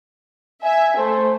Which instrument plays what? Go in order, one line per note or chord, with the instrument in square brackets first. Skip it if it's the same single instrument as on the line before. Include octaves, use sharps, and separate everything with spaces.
[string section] E5 [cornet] G#5
[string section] A3 [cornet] C5